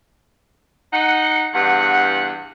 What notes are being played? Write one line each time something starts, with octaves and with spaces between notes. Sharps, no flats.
D#4 F#5
E2 G2 F#5